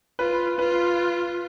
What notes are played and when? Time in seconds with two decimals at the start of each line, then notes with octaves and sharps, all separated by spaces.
0.19 F4 B4
0.59 F4 B4